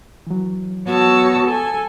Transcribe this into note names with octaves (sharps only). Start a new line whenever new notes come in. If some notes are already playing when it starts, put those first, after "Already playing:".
E3 F#3
B3 F#4 C#5 A5 E6
A4 G#5